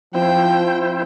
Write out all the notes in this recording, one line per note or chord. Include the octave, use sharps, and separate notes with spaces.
F3 C4 E4 C5 G5